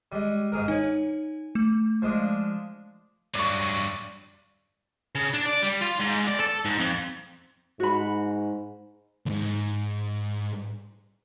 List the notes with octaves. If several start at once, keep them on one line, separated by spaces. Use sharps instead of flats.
G3 G#3
G#2 G#4 A#4
D#4 C#5 G#5
A3
F3 G#3 D4
G2 F#3 D5 C#6
C#3
D4
D5
G3
F4
G#2
D5
A4
G#2
F2
G#2 F#4 B5
D#2 G#2